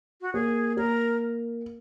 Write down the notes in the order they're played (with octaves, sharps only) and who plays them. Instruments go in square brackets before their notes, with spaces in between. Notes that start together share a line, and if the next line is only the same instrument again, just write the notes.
[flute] F#4
[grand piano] A#3 [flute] G#4
[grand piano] A#3 [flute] A#4